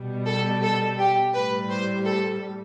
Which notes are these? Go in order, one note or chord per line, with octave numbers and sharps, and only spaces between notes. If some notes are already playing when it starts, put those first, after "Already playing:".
Already playing: B2 G3
A4
A4
G4
A2 G3 B4
C5
A4